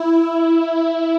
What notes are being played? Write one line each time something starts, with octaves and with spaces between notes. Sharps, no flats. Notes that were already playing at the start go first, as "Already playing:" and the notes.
Already playing: E4